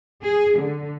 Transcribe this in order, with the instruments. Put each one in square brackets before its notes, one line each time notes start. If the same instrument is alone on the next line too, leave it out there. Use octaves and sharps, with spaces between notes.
[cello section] G#4
D3